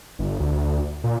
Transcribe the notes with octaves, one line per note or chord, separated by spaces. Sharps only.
G1
D2
A#2